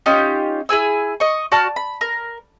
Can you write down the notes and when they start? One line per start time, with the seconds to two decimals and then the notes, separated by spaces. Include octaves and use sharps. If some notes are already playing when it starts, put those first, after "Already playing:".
0.06 C#4 D#4 F4 G4
0.69 E4 G#4 G#5 E6
1.20 D#5 C#6
1.52 F#4 D5 A5 F6
1.76 B5
2.01 A#4